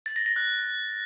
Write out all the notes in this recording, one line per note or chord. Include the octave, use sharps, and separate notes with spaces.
A6
A#6
A#6
F#6